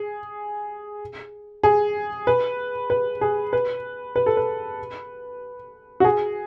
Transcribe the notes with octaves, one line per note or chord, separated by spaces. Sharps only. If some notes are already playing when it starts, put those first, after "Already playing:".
Already playing: G#4
G#4
B4
B4
G#4
B4
B4
A4
B4
F#4
G#4